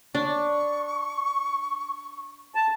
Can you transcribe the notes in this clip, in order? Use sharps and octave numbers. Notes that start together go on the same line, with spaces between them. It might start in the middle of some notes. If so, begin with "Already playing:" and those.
D4 C#6
A5